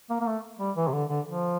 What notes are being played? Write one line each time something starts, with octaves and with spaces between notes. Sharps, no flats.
A#3
A#3
A3
G3
E3
C3
D3
D3
F3